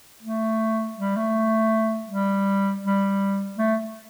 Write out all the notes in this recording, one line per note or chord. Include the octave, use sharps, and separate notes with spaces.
A3
G3
A3
G3
G3
A3